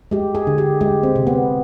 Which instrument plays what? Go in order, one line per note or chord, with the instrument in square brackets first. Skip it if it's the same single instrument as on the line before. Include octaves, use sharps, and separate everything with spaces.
[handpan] G#3 G4
G#4
D3
G4
G#3 G4
C4
C3
B3